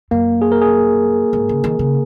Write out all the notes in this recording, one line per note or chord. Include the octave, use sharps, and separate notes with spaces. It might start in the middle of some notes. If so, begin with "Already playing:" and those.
F#2 A#3
G#4
A#4
G#4
G#2
C#3
D#3
C#3